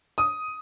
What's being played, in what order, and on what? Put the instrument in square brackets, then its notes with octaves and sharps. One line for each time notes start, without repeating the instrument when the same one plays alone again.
[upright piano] D#6